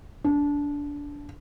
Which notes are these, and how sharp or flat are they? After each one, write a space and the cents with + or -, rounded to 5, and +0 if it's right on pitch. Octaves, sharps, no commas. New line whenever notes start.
D4 -20